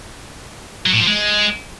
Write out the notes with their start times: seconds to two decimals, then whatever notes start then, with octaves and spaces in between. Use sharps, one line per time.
0.86 F#3
0.93 A2
1.00 F3
1.07 G#3